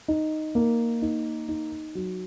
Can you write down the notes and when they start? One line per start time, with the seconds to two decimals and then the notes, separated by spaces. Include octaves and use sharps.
0.08 D#4
0.55 A#3
1.02 D#4
1.48 D#4
1.95 F#3